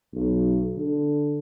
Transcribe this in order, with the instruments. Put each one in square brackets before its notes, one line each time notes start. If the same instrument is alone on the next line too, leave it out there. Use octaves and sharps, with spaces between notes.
[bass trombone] B1
D3